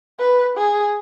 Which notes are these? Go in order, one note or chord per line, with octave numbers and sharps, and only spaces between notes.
B4
G#4